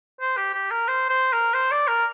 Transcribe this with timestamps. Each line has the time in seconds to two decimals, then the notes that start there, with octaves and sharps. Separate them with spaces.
0.21 C5
0.37 G4
0.54 G4
0.71 A#4
0.88 C5
1.09 C5
1.33 A#4
1.54 C5
1.71 D5
1.88 A#4